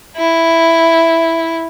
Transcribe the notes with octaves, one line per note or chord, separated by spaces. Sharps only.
E4